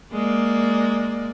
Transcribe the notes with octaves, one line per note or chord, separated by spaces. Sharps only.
G#3 A#3 D5